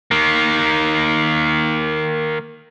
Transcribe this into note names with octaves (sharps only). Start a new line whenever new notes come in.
D#3 A#3